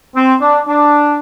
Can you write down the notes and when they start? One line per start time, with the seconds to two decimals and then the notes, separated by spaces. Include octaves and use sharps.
0.16 C4
0.41 D4
0.67 D4